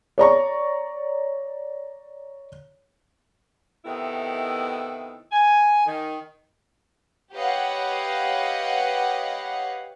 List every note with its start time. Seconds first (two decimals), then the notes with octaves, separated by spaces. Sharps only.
0.18 C#5 D5 A#5 C#6
3.85 C3 D#3 A3 B3 D#4 E4
5.32 G#5
5.86 D#3
7.36 G4 B4 C#5 D#5 F5 F#5